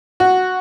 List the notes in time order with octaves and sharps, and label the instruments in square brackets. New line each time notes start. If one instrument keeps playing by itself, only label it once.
[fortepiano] F#4